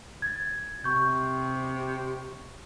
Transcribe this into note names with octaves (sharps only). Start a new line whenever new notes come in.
G#6 A6
C3 C#6 G6